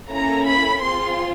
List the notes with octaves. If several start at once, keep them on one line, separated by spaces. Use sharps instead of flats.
A#3 C#4 E4 A4 A#5
B5
C4 F4 G#4 C6